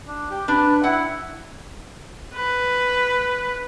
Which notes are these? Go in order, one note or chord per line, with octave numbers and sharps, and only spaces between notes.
D4
G4
D4 B4
E4 F#5
B4